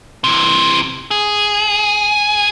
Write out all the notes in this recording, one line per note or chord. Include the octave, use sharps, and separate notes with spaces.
C3 E3
G#4